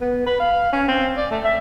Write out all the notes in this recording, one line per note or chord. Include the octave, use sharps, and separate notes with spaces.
B3
B4
F5
C#4
C4
D5
A3
E5